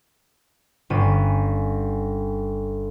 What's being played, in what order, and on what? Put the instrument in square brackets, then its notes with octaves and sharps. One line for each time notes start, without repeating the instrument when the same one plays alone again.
[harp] G1 C#4 D#7